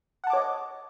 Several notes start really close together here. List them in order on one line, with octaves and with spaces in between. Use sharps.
F#5 A5 D6 C#5 D#5